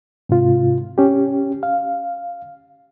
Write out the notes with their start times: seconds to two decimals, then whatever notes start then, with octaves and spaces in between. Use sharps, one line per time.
0.29 G#2 C3 F4
0.98 C#4 G4
1.63 F5